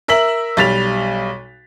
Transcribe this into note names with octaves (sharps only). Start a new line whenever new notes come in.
A#4 E5 E6 B6 F#7
B1 G3 A6 B6 F7